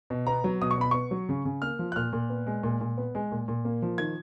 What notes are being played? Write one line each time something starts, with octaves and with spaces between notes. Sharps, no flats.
B2
B3 A#5
F#3
B2 D#6
C#6
B2 B5
B3 C#6
F#3
C#3
C#3
A#3 F6
F3
F#6
A#2 F6
A#2
B3
G#3
A#2
A#2
B3
G#3
A#2
A#2
A#3
F3
D#3 G#6